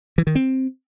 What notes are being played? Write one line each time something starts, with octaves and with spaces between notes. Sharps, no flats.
E3
D#3
C4